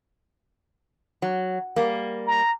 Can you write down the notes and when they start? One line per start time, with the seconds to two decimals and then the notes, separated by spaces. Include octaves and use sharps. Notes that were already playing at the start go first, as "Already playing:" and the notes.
1.22 F#3
1.76 G3 A#3
2.27 A#5